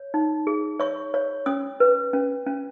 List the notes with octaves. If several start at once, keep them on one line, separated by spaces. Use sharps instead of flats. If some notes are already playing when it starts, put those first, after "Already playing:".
Already playing: C#5
D#4
G#4
C#5 C#6
C#5
C#4 D#6
B4
C#4
C#4